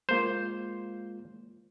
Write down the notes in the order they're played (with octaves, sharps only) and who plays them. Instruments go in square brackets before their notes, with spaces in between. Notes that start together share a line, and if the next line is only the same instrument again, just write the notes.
[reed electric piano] G#3 A#3 F4 [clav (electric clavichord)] C5